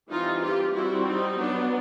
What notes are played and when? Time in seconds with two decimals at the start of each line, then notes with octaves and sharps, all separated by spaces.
0.10 E3 G3 C4 D#4 F4
0.42 F4 G4
0.74 G3 C4 E4 F#4
1.05 D#4
1.37 F#3 B3 D4